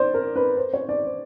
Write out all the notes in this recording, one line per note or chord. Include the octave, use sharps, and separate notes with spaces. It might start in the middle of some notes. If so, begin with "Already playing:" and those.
Already playing: C5 D5
A#4
B4
C5
C#5
D5
C5